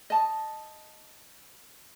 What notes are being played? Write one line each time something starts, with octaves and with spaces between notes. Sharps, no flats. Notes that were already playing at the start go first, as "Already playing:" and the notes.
D#5 A5